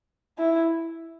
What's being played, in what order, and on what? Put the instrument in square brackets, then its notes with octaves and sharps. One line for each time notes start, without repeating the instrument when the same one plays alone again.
[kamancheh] E4